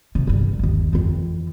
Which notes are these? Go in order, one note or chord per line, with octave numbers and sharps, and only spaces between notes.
G2 C3
E2 G2
G1 D#2
F2 E3